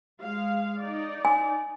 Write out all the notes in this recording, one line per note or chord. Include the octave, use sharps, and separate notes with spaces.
G#3 F5
D#4 D5
G#5